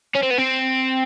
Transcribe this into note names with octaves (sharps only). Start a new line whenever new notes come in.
C#4
C4
B3
C4